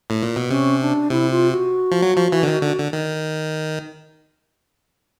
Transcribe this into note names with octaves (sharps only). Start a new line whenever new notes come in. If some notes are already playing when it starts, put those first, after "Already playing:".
A2
A#2
B2
C3 C#4
D4
C3 E4
F4
F#4
F3
F#3
F3
E3
D3
D#3
D3
D3
D#3